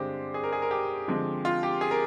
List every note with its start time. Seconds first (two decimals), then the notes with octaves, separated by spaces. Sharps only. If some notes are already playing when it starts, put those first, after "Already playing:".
Already playing: G2 D3 G#3 C4 G4 C5
0.34 G#4
0.43 A#4
0.52 G#4
0.62 A#4
0.71 G4
1.08 D3 F3 G#3 C4
1.45 F4
1.63 G4
1.81 G#4
1.91 A#4